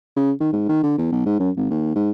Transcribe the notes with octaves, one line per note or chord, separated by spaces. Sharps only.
C#3
D#3
G#2
D#3
D3
E2
B1
G#2
F#2
G#1
D#2
G#2